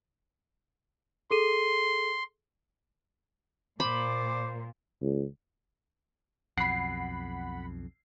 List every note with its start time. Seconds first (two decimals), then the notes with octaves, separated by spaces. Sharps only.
1.31 G#4 A4 C6 D#7
3.80 A#2 C5 B5 D6
5.02 C#2
6.58 B1 F2 F#5 B5 C7